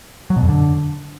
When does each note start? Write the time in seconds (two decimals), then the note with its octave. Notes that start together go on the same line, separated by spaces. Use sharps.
0.30 F#3
0.36 B2
0.42 F2
0.49 D3